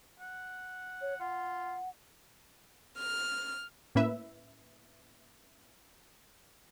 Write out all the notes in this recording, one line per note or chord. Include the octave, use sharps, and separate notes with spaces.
F#5
C#5
F4 F#5
F6
A2 A#3 C#4 E4 B4 E5